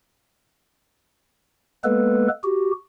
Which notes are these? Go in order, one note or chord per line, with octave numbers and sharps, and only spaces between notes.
G#3 A#3 B3 A4 B4
F#4 G4